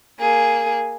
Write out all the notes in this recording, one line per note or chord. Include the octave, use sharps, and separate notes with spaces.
A#3 G#4